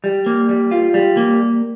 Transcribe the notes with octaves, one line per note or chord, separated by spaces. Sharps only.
G3
A#3
G3
F4
G3
A#3